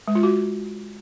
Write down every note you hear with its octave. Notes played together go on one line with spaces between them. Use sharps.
G#3
F4
F#4